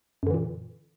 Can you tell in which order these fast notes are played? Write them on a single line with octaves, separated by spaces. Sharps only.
F#2 D3 E3 A#2